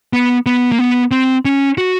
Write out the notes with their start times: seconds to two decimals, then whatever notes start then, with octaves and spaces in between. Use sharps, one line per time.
0.13 B3
0.46 B3
0.72 A#3
0.79 B3
1.11 C4
1.45 C#4
1.78 F#4